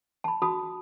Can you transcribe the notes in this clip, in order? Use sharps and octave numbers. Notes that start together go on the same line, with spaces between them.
A5 B5
F#4 A5 B5 D#6